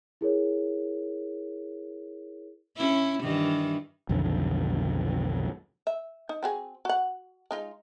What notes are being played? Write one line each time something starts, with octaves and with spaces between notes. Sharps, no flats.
E4 G#4 A#4 C#5
C#4 E4
G2 D#3 E3
B1 F2 D3 D#3
E5
D#4
C4 F#4 G#4
F#4 F#5
G#3 D#4 F4